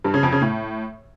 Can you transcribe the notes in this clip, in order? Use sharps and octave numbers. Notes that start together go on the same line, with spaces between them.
G2
C#3
F2
C#3
A2